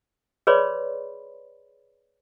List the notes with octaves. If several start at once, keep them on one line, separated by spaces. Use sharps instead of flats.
G#4 B4 C#5 D5 B5 C6